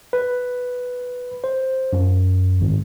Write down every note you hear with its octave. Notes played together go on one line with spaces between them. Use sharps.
B4
C5
F#2
G#1